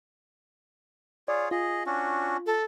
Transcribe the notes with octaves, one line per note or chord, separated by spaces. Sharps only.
F4 G#4 C#5 D5
F4 G#4 D#5
C#4 D4 F#4
A4